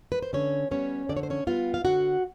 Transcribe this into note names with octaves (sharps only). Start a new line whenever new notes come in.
B4
C5
D3 C#4 C#5
G3 B3 C#4 C#5
D3 D5
C#5
C5
C#4 C#5
G3 B3 F4 F5
F5
D3 F#4 F#5